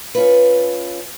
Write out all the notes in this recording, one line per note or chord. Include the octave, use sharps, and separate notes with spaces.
C#4 F4 B4